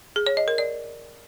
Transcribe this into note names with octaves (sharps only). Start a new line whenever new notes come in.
G#4
C#5
D#5
A#4
D5